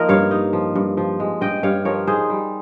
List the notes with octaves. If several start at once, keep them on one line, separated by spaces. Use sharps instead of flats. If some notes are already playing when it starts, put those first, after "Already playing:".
Already playing: F3 A#3 D#4 A#4 D#5
G2 C#5 F5
D#4
F3
G2
F3
G#3
G2 D#5 G5
G2 C#5 F5
F3 A#4 C#5
D#4 G#4 C5
G3